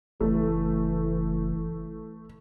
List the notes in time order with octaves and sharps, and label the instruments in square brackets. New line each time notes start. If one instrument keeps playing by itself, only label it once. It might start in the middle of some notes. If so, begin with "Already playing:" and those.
[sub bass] F#1 [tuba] E3 [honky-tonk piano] A3